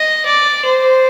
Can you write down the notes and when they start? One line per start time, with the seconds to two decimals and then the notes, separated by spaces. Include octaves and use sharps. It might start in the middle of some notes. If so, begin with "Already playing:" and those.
Already playing: D#5
0.25 D5
0.65 C5